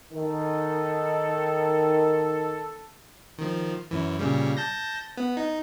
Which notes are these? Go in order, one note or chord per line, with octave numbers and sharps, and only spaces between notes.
D#3 A4
D#3 F3
F#2 E3
A#2 C#3 G3
A5 G6 A#6
B3
D#4